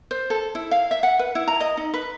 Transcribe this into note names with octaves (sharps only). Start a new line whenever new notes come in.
C5
A4
E4
F5
E5
F#5
B4
E4
A#5
D#5
D#4
B4